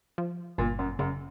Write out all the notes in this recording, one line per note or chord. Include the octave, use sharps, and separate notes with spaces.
F3
G1 A#2
F#2
F#2 C#3